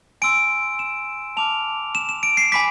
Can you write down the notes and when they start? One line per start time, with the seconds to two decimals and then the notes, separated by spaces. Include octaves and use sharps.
0.22 G#5 C6 E6 D7
0.79 E7
1.37 A5 D6 F6 F7
1.95 E7
2.09 E7
2.23 D7
2.37 C7
2.52 G#5 B5 D6 B6